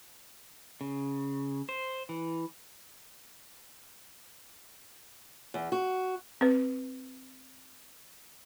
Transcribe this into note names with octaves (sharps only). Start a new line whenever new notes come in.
C#3
C5
E3
E2
F#4
C4 B4